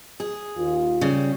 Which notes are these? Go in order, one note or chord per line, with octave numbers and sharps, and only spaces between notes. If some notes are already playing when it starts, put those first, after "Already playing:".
G#4
D#2 F4
C#3 G3